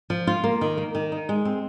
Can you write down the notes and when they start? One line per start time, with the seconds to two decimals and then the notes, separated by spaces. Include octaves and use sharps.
0.10 F3
0.27 F4
0.44 A#3
0.61 D#3
0.78 A#3
0.95 D#3
1.12 D#4
1.29 G#3
1.45 C4